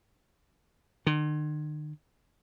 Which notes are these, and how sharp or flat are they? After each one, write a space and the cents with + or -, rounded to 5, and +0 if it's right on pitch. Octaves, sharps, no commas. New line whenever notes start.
D#3 -45